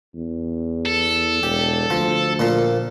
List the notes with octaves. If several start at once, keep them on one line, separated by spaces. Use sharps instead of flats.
E2
A4
E1 G4
D2 F3
A#2 F3 A#3